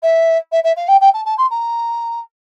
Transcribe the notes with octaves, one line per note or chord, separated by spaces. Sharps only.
E5
E5
E5
F5
G5
G5
A5
A5
C6
A#5